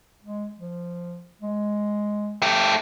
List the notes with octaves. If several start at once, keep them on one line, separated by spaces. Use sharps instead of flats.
G#3
F3
G#3
A3 G4